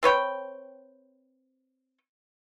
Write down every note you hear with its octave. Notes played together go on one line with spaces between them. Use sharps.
C4 B4 C#5 G5